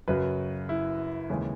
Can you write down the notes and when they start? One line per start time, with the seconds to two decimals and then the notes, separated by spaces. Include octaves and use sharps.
0.08 F#2 C#3 F#3 B4
0.69 E4
1.29 D#2 C#3 E3 G#3